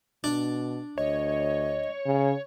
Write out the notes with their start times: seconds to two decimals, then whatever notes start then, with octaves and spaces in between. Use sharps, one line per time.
0.24 B2 D4
0.98 D2 C#5 D#5
2.06 C#3